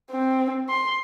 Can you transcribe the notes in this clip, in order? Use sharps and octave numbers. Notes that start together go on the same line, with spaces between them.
C4
C6